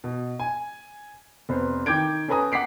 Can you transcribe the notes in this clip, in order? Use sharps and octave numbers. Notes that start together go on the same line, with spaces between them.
B2
G#5
F1 B3 C5
D#3 G5 D6 G6 G#6 D7
C#4 A4 B4 G#5 A#5 D#6
F#5 D6 B6 C7 D7